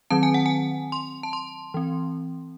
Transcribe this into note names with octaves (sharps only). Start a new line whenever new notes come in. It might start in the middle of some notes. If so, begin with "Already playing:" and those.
D#3 F#3 C4 A5
G#5
F#5
G#5
C6
A5
C6
E3 C4